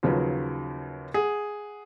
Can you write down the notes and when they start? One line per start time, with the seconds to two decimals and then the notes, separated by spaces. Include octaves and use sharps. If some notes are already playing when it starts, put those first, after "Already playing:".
0.03 D#2 C#3 F3 F#3 B4
1.14 G#4 F#5